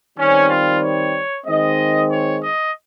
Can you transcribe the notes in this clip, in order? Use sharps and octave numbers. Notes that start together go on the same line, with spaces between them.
D#3 G3 C4 C#4
F4
C#5
D#3 G#3 C4 D#5
C#5
D#5